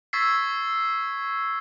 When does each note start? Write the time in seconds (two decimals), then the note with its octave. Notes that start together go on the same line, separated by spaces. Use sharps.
0.13 C#6 E6 G#6 A6 B6 C7